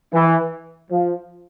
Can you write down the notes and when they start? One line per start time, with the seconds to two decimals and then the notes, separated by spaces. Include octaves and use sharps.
0.13 E3
0.91 F3